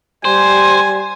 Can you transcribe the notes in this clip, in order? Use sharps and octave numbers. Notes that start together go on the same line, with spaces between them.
G3 C5 G#5